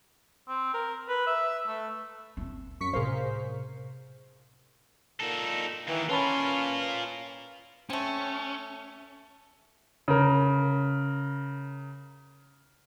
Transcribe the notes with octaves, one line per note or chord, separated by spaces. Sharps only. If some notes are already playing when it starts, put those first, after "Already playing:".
C4
A#4
B4
E5
A3
C4 C#4
F#2 C#6 B6 C#7
A2 C3 G#4 A#4 C5 F5
A#2 D#4 A4
D#2 D#3 E3
C#4 F4 A#4 B4 A5 B5
A3 C4 C#4
C#3 A#4